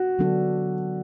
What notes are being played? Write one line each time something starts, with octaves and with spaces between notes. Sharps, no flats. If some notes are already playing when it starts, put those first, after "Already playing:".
Already playing: F#4
D3 F#3 B3 D4 A4